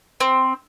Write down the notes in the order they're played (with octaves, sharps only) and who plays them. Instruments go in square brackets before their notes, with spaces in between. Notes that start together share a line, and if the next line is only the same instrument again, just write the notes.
[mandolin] C4